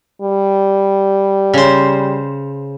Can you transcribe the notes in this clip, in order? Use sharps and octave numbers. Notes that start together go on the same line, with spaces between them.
G3
C#3 C5